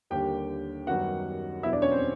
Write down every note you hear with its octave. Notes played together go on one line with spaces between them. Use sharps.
D#2 D3 G3 A#3 G4 G5
F#2 D#3 G3 B3 F#4 F#5
E2 B2 F#3 B3 E4 E5
D4 D5
C#4 C#5
C4 C5